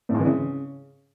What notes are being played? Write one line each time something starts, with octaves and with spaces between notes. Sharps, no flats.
A2
G#2
E3
C#3